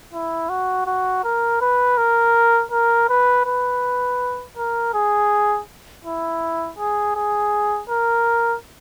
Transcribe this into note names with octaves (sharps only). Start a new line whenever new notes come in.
E4
F#4
F#4
A#4
B4
A#4
A#4
B4
B4
A#4
G#4
E4
G#4
G#4
A#4